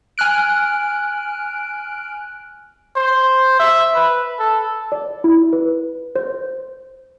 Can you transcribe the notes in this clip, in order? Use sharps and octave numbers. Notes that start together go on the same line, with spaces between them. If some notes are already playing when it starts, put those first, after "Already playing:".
G#5 F6 F#6 D7
C5
E5
B4
A4
D5
E4
B4
C5